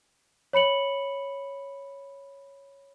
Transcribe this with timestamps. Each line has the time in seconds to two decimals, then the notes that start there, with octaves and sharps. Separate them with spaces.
0.53 C#5 B5 C#7 F#7